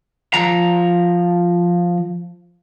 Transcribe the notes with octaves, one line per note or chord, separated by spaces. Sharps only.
F3 A#5